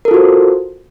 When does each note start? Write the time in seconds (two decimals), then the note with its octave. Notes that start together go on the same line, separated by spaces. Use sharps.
0.05 A#4
0.08 A4
0.11 F4
0.14 F#4
0.17 C5